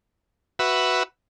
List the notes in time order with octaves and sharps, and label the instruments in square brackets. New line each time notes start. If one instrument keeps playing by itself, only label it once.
[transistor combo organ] F#4 B4 E5